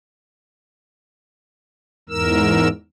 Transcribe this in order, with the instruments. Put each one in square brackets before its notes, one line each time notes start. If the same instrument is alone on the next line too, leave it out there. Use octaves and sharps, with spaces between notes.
[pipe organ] E2 G#2 A#4 E6